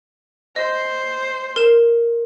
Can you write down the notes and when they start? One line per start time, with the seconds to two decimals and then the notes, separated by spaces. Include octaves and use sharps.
0.56 C5 D#5
1.56 A#4 E7